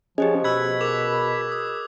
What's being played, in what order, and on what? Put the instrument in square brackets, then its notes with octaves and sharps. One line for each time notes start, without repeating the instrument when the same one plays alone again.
[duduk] F3 [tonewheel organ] C#4 G#4 [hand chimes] G4 C5 D#5
[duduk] B2 [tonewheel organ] B5 [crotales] E6 F#6 G#6
[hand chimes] G#4 A#4 [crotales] D6 F7
[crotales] D#6